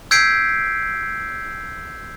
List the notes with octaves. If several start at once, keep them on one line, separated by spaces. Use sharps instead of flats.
E6 G6 G#6 B6 C7 D7